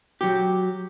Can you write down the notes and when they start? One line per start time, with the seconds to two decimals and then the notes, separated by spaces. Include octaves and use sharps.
0.21 F#3 G4